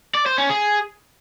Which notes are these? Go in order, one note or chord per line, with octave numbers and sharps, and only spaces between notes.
D5
C5
C#4
G#4